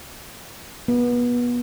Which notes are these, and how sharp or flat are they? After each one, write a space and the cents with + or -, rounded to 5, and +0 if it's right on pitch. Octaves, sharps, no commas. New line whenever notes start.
B3 -25